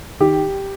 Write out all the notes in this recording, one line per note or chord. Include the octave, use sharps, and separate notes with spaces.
D#3 G4